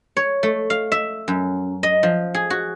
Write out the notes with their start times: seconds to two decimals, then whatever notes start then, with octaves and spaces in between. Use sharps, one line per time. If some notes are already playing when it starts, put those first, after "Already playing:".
0.17 C#5
0.43 A3
0.70 F5
0.92 E5
1.28 F#2
1.83 D#5
2.03 F3
2.34 G#4
2.50 F#4